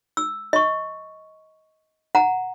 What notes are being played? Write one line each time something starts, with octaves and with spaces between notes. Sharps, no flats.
E6
D#5 C#6
F#5 A#5